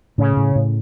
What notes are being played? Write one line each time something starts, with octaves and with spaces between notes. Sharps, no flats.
A2 C#3
A2
A2